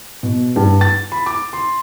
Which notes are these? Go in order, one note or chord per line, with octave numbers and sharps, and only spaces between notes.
B2
G2
A6
B5
D6
C6